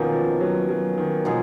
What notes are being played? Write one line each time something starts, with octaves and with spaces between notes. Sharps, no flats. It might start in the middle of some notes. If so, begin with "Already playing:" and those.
Already playing: B2 D#3 F3 A#3 C#4
F3
F#3
F#3
D#3
B2 F3 G#3 D#4 G#4